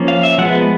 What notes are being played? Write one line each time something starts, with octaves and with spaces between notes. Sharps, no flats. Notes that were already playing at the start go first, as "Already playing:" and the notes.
Already playing: F3 A#3 C#4
F5
E5
F3 G#3 B3 F#5